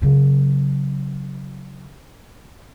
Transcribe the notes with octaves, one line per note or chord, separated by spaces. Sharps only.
C#3 F#3